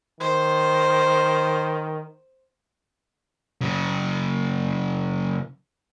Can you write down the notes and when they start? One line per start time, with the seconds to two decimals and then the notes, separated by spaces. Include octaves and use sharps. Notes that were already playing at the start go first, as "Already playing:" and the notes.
0.21 D#3 C5
3.61 C#3 F#3